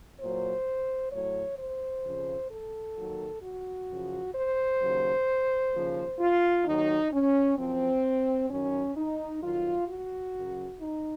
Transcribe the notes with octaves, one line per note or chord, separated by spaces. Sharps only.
A#2 F#3 C5
A2 F#3 C#5
C5
F2 C#3 F3
A4
D#2 D#3 F#3
F#4
F#2 C#3 F3
C5
D#2 C#3 F#3
D#2 C#3 F3
F4
D#2 D#3 F#3 D#4
C#4
F#2 F3 C4
F#2 D#3 F#3 C#4
D#4
F2 D#3 F#3 F4
F#4
F#2 C#3 F#3
D#4